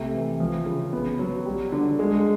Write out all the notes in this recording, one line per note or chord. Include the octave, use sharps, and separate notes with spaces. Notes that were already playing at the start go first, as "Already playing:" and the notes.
Already playing: C3 A3
E3
F3
C#3
B3
F#3
G3
D3
G#3